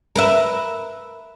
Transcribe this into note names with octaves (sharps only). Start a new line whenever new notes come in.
A#4 B4 E5